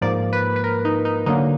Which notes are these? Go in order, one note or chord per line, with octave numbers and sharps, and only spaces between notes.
G#2 F3 A#3 D5
B4
B4
A#4
D#4
D#4
D3 F#3 A#3 D#4